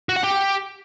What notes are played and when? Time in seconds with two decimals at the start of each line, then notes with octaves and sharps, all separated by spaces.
0.09 F#4
0.16 F#5
0.24 G4